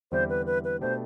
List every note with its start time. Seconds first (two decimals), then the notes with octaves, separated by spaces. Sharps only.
0.12 E2 D3 G3 C4 E4 C5
0.30 B4
0.46 B4
0.64 B4
0.81 B2 A3 D4 G4 C5